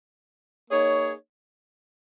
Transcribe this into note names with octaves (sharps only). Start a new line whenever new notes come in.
A#3 D#4 G#4 C#5